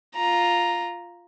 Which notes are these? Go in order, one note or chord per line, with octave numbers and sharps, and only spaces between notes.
F4 A#5